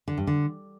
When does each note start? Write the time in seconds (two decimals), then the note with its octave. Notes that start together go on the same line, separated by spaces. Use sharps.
0.08 D3
0.17 G2
0.27 D3